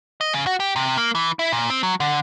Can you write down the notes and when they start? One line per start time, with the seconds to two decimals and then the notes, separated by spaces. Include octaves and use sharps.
0.21 D#5
0.33 C#3
0.47 F#4
0.60 G4
0.76 C3
0.98 A#3
1.15 E3
1.39 E4
1.53 A#2
1.70 C4
1.83 F#3
2.00 D3